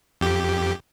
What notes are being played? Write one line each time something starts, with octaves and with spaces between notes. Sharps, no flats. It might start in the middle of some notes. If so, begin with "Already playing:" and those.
F2 G4